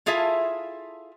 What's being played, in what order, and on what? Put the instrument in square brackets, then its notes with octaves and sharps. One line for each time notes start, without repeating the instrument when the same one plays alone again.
[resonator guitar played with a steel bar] E4 F4 G#4 A4 E5 F5